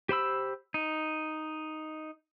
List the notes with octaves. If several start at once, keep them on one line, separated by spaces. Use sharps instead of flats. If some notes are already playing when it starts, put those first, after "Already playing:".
G4 C5 B5 E6
D#4